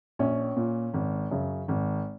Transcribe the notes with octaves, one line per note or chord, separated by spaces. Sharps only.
A#1 C#4
A#2
G#1
F#2 C#3
G#1